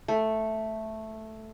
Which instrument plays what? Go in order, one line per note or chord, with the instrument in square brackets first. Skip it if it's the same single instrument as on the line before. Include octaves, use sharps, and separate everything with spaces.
[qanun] A3